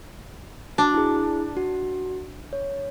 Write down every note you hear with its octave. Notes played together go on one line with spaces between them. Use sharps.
D4 F#4
E4 G#4
F#4
C#5